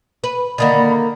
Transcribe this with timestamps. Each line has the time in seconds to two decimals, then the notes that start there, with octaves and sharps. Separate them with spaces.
0.24 B4
0.58 D3 D#3 A#3 D5 F#5 B5